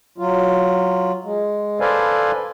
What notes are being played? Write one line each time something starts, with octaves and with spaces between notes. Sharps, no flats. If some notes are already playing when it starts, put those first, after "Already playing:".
F#3 F4
G#3
A4 B4 C5 D5 F5 G#5